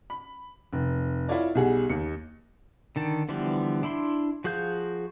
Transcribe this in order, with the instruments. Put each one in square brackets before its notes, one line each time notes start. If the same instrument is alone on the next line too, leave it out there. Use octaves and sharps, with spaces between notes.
[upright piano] B5
F1
E4 F4 A4 C#5 D5
B1 G3 G#4 F#5
D#2 C#7
[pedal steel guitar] D3 D#3 A5
D3 E3 F3 G3 B3
D4 E4 B5 C6
F3 F#4 G#4 F5 G6